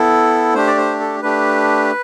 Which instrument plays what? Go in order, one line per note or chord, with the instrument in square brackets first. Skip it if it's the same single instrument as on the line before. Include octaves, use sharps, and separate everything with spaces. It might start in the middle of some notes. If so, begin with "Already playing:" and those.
Already playing: [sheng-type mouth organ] B3 E4 A4
A3 D4 G4 C5
D5
C5
A4
A3 D4 G4 B4